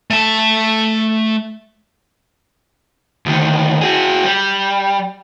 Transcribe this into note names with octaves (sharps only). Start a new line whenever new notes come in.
A3 A5
D2 D#3
F#4 G#4
G3